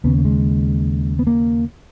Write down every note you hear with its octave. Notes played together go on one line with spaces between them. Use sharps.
D#2 C#3 B3
A#3
G#3
B3
A#3